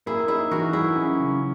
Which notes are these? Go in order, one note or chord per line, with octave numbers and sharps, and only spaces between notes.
A#3 E4 G#4
D#4 E4 G#4
E3 F#4 A#4
F#3 E4 G#4
C#4
C#3